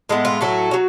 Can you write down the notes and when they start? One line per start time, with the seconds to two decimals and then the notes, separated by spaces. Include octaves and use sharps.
0.09 A2 G#3 B3
0.25 F4
0.41 A2 F#3 A3 F#4
0.71 F#3 C#4